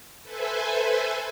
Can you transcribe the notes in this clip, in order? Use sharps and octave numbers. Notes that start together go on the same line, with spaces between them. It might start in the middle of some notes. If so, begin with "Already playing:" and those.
A4 B4 C5 E5 G#5